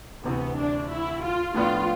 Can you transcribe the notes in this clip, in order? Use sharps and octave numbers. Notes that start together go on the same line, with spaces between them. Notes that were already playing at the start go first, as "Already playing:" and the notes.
D2 C3 E3 B3
D4
E4
F4
A2 F3 B3 D4 F4